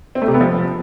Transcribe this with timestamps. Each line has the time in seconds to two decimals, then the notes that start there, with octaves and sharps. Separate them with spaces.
0.15 C4
0.22 A3
0.28 C3
0.34 B3
0.41 F3